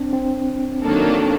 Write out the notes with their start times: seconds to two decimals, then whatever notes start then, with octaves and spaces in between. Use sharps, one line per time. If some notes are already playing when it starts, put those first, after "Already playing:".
Already playing: C4 D4
0.13 C4
0.82 D#3 F#3 A#3 D4 A4